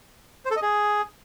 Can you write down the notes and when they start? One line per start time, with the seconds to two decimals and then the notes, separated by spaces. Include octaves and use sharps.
0.45 C5
0.51 A4
0.57 D#5
0.62 G#4